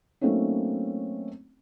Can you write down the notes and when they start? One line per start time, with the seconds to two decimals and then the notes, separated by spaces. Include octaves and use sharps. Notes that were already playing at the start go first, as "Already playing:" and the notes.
0.21 F#3 A3 A#3 C4 C#4 D#4